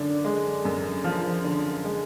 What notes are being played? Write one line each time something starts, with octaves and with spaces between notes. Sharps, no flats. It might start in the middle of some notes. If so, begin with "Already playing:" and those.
Already playing: F#2 D3 D5
G#3
F#2
F3
D3
G#3